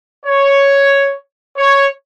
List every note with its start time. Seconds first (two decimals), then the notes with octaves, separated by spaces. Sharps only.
0.26 C#5
1.57 C#5